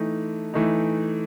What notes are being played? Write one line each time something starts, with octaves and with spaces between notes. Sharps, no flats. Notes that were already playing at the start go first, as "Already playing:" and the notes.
Already playing: E3 A3 D#4
E3 A3 D#4